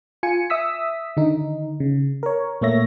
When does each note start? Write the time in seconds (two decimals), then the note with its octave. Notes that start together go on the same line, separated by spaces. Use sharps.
0.23 F4 G#5 C#7
0.50 E5 D#6 E6 B6
1.17 D3 D#3 D#4
1.80 C#3
2.23 A#4 C#5
2.61 A#2 A3 A#3 C#5 E5 A#6